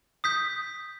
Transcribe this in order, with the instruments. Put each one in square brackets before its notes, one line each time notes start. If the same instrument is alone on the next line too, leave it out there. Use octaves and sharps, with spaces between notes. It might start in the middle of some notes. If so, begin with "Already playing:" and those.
[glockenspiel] D#6 G6 B6